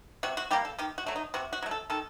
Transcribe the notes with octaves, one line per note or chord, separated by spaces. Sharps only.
C3 F#4
F#4
G3 A#3 G4
A4
D#3 G4
F#4
F#3 A3
D#4
C3 F#4
F#4
F#3 A3
A4
D#3 A4